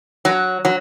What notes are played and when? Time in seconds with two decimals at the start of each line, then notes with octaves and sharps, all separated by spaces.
0.25 F#3
0.65 F#3